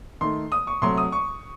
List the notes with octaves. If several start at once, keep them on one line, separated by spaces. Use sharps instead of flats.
D#3 A3 C6
D#6
C#6
C3 F#3 A3 C6
D#6
C#6